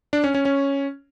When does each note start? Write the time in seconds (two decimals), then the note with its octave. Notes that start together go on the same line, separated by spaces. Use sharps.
0.13 D4
0.24 C#4
0.35 C#4
0.45 C#4